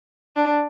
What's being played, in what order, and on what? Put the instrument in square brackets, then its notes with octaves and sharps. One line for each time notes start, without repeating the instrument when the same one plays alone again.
[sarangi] D4